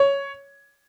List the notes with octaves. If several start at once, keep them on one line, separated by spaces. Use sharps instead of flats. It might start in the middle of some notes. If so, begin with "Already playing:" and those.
Already playing: C#5